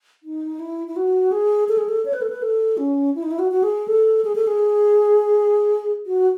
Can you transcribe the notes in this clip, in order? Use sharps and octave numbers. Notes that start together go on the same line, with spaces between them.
D#4
E4
E4
F#4
G#4
A4
G#4
A4
C#5
B4
A4
B4
A4
C#4
E4
D#4
E4
F#4
F#4
G#4
A4
G#4
A4
G#4
F#4